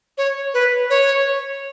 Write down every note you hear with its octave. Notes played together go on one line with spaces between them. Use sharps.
C#5
B4
C#5